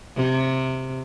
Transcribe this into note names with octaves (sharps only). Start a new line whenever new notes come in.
C3